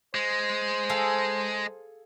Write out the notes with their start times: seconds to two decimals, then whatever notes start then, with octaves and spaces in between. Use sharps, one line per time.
0.15 G#3 C5
0.89 G#4 A4 F5